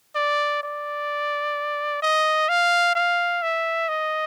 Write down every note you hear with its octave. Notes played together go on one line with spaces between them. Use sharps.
D5
D5
D#5
F5
F5
E5
D#5